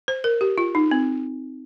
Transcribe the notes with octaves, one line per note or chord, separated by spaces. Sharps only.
C5
A#4
G4
F4
D#4
C4